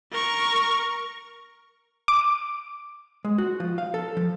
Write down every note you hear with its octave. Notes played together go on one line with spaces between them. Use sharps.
A#4 C#6
D6
G#3
F#4
F3
F5
A4
F3